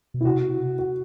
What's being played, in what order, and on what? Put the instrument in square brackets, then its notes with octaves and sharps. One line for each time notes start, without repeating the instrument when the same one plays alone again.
[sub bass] B2
[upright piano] E4
[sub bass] C3 [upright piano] F#4
[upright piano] F#4